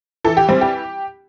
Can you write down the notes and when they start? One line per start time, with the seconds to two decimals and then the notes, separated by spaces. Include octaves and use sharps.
0.24 E3 A4
0.37 G4
0.49 G3 C4
0.61 G4